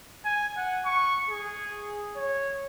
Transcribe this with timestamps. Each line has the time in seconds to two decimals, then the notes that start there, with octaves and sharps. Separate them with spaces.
0.25 G#5
0.57 F#5
0.85 C#6
1.30 G#4
2.16 C#5